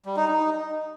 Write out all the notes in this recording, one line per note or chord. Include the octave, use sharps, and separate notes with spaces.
G3
D#4
D#4